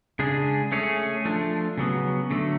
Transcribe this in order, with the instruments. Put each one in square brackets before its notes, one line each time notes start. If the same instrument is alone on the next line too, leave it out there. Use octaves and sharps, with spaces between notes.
[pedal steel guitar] C#3 G#3 D4 G#4
A3 C#4 G#4 C#5
F3 A3 D4
C#3 F#3 B3
D3 F#3 A3